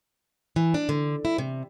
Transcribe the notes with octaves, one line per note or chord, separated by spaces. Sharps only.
E3
D4
D3
E4
C3